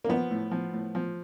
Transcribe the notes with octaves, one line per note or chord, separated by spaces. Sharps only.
A#3
F3 B3
A2
F3
A2
F3